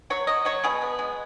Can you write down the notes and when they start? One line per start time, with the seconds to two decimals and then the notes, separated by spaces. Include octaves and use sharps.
0.10 F#3 C#5
0.27 F#3 D#5
0.45 F#3 C#5
0.64 B2 G#4
0.81 B3
0.99 G#3